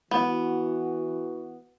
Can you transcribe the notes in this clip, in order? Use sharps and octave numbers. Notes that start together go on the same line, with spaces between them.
E3 B3 F#4